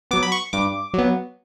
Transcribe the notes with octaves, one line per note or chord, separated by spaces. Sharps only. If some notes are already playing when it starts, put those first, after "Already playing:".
F#3 B3 D6
B5
C#6
G2 D6
F#3 B3